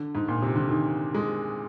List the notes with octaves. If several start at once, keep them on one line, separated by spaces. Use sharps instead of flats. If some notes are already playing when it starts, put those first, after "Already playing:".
Already playing: D3
G#2
A#2
C3
D3
D#3
G#3